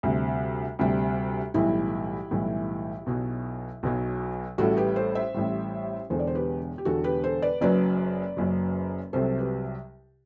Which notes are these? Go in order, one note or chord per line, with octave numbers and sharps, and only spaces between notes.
D2 C3 G3
D2 C3 G3
B1 A2 E3 G3 E4 G4
B1 A2 E3 G3
B1 B2 F#3
B1 B2 F#3
A1 A2 G3 F#4 A4
G4 B4
A4 C5
C5 E5
A1 A2 G3
E1 E2 D3 A4 C5
D5
C5
G4 B4
G4
E1 E2 D3 F#4 A4
G4 B4
A4 C5
B4 D5
F#1 F#2 F#3 B4 D5
F#1 F#2 F#3
C2 C3 F#3 A4 C5
G4 B4